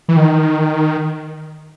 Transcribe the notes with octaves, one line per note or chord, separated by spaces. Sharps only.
E3
D#3